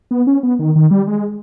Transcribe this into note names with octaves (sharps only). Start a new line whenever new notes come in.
B3
C#4
B3
D#3
D#3
G3
G#3